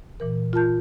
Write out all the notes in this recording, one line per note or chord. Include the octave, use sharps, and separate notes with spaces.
A#2 E3 A#4
F4 A#4 A5 G6